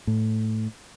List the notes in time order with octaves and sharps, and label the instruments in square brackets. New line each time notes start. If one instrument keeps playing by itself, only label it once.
[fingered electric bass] A2